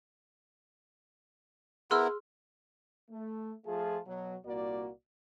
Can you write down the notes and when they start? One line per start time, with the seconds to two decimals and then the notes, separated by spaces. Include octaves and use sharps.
1.91 B3 E4 G#4 A#4 C6 E6 F6
3.11 A3
3.66 F3 A3 F4 G#4 A5
4.07 B2 F#3
4.46 C2 A#2 A#3 F#4 D5